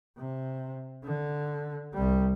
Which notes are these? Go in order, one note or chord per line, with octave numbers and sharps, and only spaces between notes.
C3
D3
C2 G3